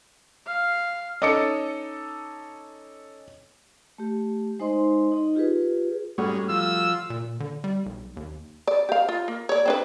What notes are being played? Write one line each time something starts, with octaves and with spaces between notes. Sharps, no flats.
F5
C#4 D#4 A4 D#5 D6 C#7
A3 G4
G#3 D#4 C5 D#5 C6
D#4 D#5
F4 G4 G#4 B4
G#2 G3 A3 C#4 F#4
F3 E6
A#2
D3
G3
B1
D#2
D5
G4 F5
F4
A#3
C#5 D5
C4 D4 B4